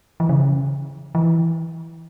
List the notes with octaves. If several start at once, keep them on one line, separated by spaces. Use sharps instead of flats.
E3
C#3
E3